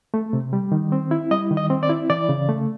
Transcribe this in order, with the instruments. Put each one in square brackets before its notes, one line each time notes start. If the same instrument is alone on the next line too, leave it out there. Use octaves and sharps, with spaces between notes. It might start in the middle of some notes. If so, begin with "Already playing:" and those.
[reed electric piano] A3
C3
G3
D#3
C4
E4
G3 D#5
D#3
D#5
C4
D5
E4
E3 D5
C#3
A3